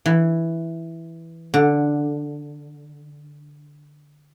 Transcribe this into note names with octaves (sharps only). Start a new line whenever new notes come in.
E3
D3